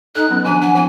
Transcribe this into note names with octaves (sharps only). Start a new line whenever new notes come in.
D#4 A4 G#5 F#6
F#3 B3 C#4
D#3 F3 D4 G#5
D4 F#5 G#5
F3 C4 E4 G#5